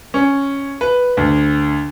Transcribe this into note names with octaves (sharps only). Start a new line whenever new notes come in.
C#4
B4
D2